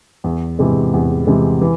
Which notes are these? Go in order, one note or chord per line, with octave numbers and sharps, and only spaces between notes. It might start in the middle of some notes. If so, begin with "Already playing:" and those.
E2
C3 E3 G#3
E2
C3 E3 G#3
E3